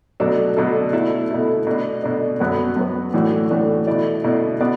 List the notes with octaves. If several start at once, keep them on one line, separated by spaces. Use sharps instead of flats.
B2 F#3 A3 D4 A4
B2 F#3 A3 D4 A4
B2 A3 E4 A4
B2 A3 E4 A4
B2 A3 D4
B2 A3 D4
F#2 F#3 B3 F#4 B4
F#2 F#3 B3 F#4 B4
A2 E3 A3 D4 F#4
A2 E3 A3 D4 F#4
B2 A3 E4 D5
B2 A3 E4 D5
B2 B3 F#4 D5